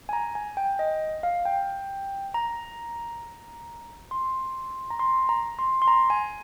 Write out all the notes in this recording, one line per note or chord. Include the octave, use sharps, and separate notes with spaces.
G#5
A#5
G#5
G5
D#5
F5
G5
A#5
C6
A#5
C6
A#5
C6
C6
A#5
G#5